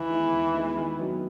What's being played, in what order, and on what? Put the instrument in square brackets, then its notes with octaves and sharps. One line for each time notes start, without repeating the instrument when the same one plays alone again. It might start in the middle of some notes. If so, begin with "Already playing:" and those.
Already playing: [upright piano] D#2 [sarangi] E3
[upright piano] D#3 G#3 B3 E4
D#2
D#3 G#3 B3 E4
D#3
F#3 B3 D#4